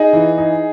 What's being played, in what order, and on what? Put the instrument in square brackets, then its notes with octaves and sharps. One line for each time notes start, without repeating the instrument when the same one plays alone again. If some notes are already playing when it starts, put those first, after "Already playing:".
Already playing: [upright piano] D#4 G#4
E3
D#4